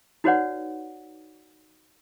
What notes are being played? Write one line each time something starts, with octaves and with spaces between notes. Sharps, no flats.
D#4 F#4 B4 C#5 D5 F#5